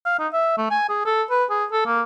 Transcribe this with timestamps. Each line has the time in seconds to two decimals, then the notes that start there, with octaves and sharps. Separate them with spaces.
0.06 F5
0.19 D#4
0.33 E5
0.58 A3
0.71 G#5
0.89 G#4
1.06 A4
1.31 B4
1.50 G#4
1.72 A4
1.86 A#3